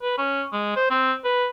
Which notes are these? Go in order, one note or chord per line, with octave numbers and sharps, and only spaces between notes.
B4
C#4
G#3
C5
C4
B4